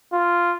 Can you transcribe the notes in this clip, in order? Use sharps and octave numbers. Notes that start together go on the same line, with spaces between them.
F4